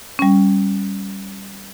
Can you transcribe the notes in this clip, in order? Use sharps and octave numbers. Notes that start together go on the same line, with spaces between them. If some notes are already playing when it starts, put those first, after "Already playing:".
G3 C#4